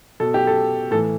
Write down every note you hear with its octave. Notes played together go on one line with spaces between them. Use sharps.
B2 A4
G4
A4
A2 E3 A4